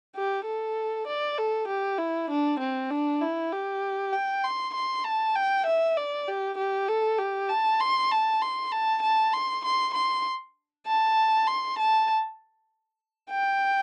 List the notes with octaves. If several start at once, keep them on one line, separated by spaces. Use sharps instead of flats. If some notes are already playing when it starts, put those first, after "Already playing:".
G4
A4
D5
A4
G4
E4
D4
C4
D4
E4
G4
G5
C6
C6
A5
G5
E5
D5
G4
G4
A4
G4
A5
C6
A5
C6
A5
A5
C6
C6
C6
A5
C6
A5
G5